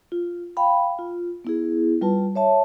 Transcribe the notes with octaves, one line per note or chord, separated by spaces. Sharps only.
F4
F5 G5 B5
F4
B3 E4 G#4
G3 F4 B4 A5
C#5 E5 A5